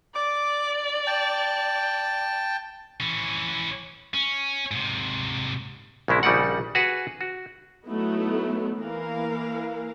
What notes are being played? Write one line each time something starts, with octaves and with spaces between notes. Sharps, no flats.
D5 D6
G5 A5
E3 C#4
C#4
G#2 C3
A#1 C#3 G#3 E4
A#1 C#3 G3 D#4 D5 F#5
F#4 G#4 B4 F#5
F#4
F#3 A3 B3 D#4 E4
E3 A#3 A#4 F5